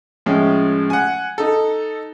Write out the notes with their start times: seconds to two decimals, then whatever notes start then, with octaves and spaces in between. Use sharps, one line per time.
0.26 A2 F3 G#3 C#4
0.90 F#5 G#5
1.38 D#4 A4